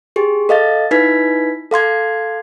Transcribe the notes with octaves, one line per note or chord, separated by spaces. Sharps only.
G4 G#4
A4 D#5 F5 A6
D#4 E4 B4 G#6 B6
A4 F5 C6 G#6